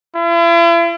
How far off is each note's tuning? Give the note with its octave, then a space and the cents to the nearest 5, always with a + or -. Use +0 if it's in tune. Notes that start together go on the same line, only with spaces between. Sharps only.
E4 +45